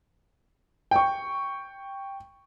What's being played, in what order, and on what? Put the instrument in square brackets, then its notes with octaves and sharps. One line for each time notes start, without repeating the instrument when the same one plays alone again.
[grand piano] G5 C#6